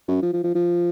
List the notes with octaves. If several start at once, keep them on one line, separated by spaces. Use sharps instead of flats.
F#2
F3
F3
F3
F3